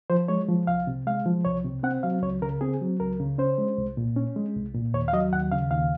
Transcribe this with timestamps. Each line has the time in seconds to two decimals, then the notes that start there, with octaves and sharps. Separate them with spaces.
0.10 F3 C5
0.28 G#3 C#5
0.48 F3
0.67 C2 F5
0.87 C3
1.07 G#3 F5
1.26 F3
1.45 C2 C#5
1.64 C3
1.83 C4 F#5
2.03 F#3 F5
2.22 C#2 C#5
2.42 C#3 A#4
2.61 C4 G#4
2.81 F#3
3.00 C#2 A#4
3.20 C#3
3.38 C#4 C5
3.58 G#3
3.78 C2
3.97 A#2
4.16 C#4
4.36 G#3
4.56 C2
4.74 A#2
4.94 D#2 C#5
5.08 F5
5.13 F#3 D#5
5.33 D#2 F#5
5.52 C#3 F5
5.71 D#2 F5